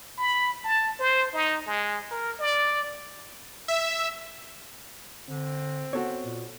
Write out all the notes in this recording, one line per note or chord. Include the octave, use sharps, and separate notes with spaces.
B5
A5
C5
D#4
G#3
A#4
D5
E5
D3 C4
B3 F#4 A4 C#5
A#2